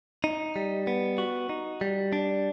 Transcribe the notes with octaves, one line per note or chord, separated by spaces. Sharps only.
D#4
G3
B3
F#4
D#4
G3
D4